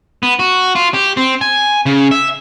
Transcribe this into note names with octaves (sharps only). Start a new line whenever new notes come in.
B3
F#4
F4
G4
C4
G#5
C#3
E5